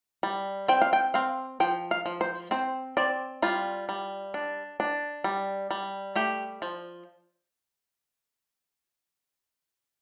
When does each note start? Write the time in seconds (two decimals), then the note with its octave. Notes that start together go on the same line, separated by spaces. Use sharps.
0.23 G3
0.68 C4 G5
0.82 F5
0.93 G5
1.14 C4 F5
1.60 F3 G5
1.91 F5
2.06 F3
2.21 C5
2.51 C4 C5
2.97 C4 D5
3.42 G3 F4
3.89 G3
4.34 D4
4.80 D4
5.24 G3
5.71 G3
6.16 A3 G4
6.62 F3